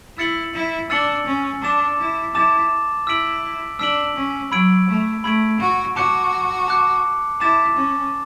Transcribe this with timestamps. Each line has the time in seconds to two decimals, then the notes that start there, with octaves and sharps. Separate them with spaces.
0.18 E4 E6 A6 C#7 F#7
0.54 E4
0.90 D4 E6 A6 C#7 F#7
1.26 C#4
1.63 D4 A5 D6 A6 E7
1.99 E4
2.34 E4 A5 D6 A6 E7
3.07 E4 E6 B6 D7 F#7
3.79 D4 E6 B6 D7 F#7
4.16 C#4
4.52 F#3 B5 E6 G#6 D7
4.88 A3
5.24 A3 B5 E6 G#6 D7
5.60 F#4
5.96 F#4 A5 D6 F#6 C#7
6.68 A5 D6 F#6 C#7
7.40 E4 A5 D6 A6 E7
7.77 C#4